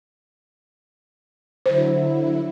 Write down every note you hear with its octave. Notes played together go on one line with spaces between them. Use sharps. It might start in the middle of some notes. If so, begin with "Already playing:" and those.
D3 F#3 E4 C5